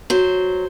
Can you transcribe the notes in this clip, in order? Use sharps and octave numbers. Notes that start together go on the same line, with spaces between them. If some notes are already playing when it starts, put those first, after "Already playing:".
F#3 C5